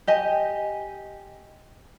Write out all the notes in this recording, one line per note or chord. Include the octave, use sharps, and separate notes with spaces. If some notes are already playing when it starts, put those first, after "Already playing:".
G4 D#5 G#5